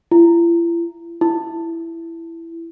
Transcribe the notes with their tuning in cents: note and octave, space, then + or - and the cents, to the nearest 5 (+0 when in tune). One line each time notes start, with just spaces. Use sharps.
E4 +45
E4 +10